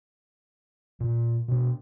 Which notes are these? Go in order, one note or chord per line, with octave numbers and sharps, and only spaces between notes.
A#2
B2 D4